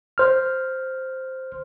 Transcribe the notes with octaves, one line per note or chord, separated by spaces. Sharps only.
C5 F6